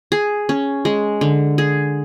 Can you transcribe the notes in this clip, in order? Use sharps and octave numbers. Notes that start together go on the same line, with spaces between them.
G#4
C#4
G#3
D3
G#4